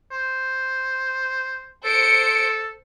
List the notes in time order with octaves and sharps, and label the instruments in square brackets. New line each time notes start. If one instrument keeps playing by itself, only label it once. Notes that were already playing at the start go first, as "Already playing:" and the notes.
[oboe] C5
[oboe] A4 [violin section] C5 C#7 D7